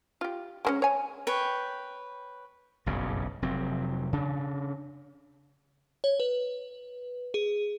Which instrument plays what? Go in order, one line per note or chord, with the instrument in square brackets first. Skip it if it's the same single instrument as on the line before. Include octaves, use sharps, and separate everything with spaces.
[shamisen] F4 G4
G#3 A#3 C#4
C#5 G#5
[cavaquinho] B4 C#5 G5
[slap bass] F#1 B1 G2 C#3
F1 F#3 C4
C#3 D4
[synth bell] C#5
B4
G#4